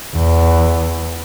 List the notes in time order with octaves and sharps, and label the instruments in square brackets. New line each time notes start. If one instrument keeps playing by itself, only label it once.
[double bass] E2